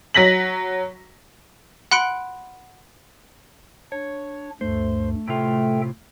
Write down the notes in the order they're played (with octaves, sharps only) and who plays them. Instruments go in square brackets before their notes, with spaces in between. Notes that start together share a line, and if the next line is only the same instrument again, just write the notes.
[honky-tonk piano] F#3 A#6 B6 F#7
[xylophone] F#5 B5 C6 F#6 C#7 D7
[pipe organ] D4 [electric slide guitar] C#5
[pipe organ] D2 G2 [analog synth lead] A3 [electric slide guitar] C5
[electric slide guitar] A2 C3 F4 [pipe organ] A4 E5 G5